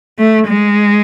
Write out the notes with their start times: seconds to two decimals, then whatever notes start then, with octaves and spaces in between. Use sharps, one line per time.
0.19 A3
0.47 G#3